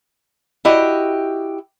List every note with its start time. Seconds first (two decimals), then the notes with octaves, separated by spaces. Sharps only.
0.65 E4 F#4 G4 D#5